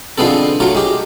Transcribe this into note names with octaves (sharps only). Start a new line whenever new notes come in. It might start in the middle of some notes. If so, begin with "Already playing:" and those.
D3 F3 G#3 B3 C4 A4
F#3 A3 F4
G#3 G4